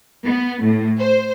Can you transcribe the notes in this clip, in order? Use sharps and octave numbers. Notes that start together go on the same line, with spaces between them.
B3
A2
C5